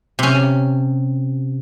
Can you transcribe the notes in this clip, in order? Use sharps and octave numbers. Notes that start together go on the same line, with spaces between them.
C3 C#4